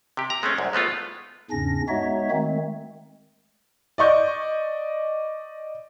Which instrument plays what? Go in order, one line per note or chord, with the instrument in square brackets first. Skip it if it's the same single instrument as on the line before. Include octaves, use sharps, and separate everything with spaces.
[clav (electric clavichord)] C3 G4
A#5
G#3 A3 C4 C#4
C2 F#2
G#3 A3 B3 F4
[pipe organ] E2 G#2 C#3 C#4 D4 A#6
G#3 B3 D#4 F#4 C#5 E5
D#3 G#3 A3 C4
[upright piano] D5 D#5 C#6 G6